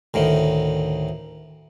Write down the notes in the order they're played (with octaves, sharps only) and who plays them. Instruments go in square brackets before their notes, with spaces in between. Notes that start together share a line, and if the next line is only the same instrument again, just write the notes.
[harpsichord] D2 A2 D#3